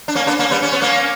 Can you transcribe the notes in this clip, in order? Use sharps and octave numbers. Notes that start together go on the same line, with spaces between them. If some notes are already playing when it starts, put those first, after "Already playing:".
D4
A#3 C#4
B3 D4
A#3 C#4
G3 B3
C#4
B3
A#3 C#4